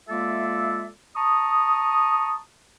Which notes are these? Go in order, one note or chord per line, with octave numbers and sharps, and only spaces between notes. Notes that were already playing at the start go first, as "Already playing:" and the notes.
G#3 A#3 F4 A4 D5 E5
A5 A#5 C#6 D#6